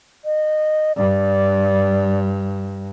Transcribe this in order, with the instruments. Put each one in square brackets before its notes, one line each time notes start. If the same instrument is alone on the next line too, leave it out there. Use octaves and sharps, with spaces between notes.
[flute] D#5
[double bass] G2 [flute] D5